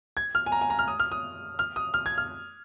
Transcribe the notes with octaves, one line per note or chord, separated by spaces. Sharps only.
G#6
F6
G#5
A#5
G#5
A#5
F6
D#6
F6
D#6
F6
D#6
F6
G#6
F6